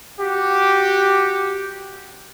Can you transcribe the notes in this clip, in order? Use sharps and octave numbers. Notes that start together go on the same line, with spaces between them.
F#4 G4